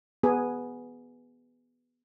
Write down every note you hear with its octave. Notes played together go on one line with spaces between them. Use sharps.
B3 G#4